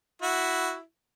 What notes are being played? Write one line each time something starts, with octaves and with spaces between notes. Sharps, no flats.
E4 F#4